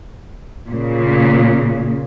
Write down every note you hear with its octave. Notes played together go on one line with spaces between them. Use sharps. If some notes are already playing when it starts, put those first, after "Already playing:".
A#2 C#3